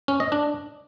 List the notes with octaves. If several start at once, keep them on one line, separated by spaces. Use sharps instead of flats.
C#4
D#5
D4